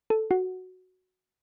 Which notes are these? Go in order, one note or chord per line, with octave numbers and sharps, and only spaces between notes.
A4
F#4